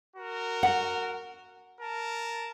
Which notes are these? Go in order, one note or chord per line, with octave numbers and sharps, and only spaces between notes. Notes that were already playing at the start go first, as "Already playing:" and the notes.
F#4 A#4
F#5
A#4 A5